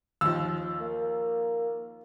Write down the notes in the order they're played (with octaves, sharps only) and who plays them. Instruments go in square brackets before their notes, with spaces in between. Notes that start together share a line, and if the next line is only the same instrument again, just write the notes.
[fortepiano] D#2 F3 [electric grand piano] E6
[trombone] A#3